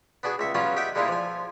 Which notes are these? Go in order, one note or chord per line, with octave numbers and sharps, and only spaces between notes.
B3 D4 F#4 G#4
C#2 E5 C#6
F#3 G3 B3 C#4 F4 F#4
G4 D#5 E5 F#5 G5
G3 G#3 A#3 D4 E4 F4
F3 G#5